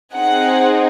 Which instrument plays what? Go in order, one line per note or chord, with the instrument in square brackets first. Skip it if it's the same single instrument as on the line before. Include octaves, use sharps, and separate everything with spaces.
[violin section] C4 D#4 G#4 F#5